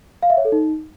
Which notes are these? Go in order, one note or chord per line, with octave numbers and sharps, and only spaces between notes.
F5
E5
C#5
A4
D#4